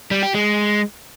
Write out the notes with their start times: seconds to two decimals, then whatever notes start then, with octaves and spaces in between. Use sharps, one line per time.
0.11 G3
0.23 G4
0.34 G#3